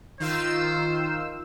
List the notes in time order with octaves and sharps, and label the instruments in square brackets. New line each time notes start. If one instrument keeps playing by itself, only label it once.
[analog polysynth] D#3 F4 E6 [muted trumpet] C5